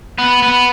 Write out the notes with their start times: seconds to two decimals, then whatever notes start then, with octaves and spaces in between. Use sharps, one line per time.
0.18 B3
0.43 B3